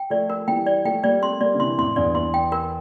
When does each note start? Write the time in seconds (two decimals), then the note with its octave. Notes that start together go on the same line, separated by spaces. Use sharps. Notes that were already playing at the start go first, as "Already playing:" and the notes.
Already playing: G5
0.10 F3 A3 D5
0.30 A#4
0.48 E3 G3 G5
0.67 D5
0.85 F3 A3 G5
1.04 G3 A#3 D5
1.22 A3 C4 C6
1.41 G3 A#3 D5
1.54 D3
1.59 C3 E3 C6
1.78 F2 A2 C6
1.96 E2 G2 D5
2.15 E2 C6
2.34 G5
2.52 A#4